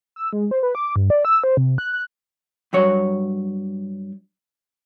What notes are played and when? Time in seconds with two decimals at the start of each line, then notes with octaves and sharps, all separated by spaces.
0.16 E6
0.33 G#3
0.51 C5
0.63 B4
0.75 D6
0.96 G2
1.10 D5
1.25 E6
1.44 C5
1.57 C3
1.78 F#6
1.93 F#6
2.73 G2 F#3 C#5